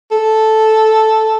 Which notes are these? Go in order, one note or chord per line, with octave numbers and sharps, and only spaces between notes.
A4